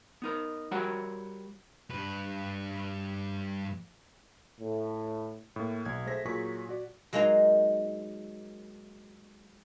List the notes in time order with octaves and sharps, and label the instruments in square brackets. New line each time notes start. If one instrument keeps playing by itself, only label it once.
[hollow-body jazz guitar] B3 D#4 A#4
G3 F#4 G4 A#4 C#5 F#5
[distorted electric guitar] G2 B4
[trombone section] A2
[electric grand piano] A2 A#3
B1 G#6
A3 G#4 C5 A#6 B6
A#2 F#3 G#4 C#6 B6
F#4 D5
[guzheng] F#3 G#3 A#3 D#4 A#5